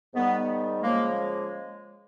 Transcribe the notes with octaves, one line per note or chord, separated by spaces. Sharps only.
G#2 D#3 G3 B3
C#3 F3 G#3 A#3